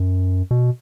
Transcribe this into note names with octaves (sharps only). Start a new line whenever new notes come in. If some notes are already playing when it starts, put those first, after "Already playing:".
Already playing: F#2
B2